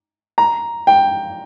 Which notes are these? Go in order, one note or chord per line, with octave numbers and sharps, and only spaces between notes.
A#5
G5